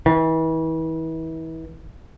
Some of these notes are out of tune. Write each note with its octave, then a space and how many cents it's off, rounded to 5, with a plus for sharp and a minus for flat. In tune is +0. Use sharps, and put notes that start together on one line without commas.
E3 -35